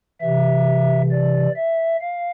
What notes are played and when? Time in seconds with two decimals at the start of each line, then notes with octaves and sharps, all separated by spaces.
0.21 C3 E3 E5
1.11 D5
1.56 E5
2.01 F5